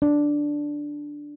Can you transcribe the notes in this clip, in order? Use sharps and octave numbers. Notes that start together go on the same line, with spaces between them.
D4